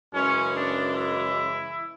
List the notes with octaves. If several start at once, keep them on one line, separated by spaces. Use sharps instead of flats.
F#2 C#3 E3 G#3 C#4
D4
E4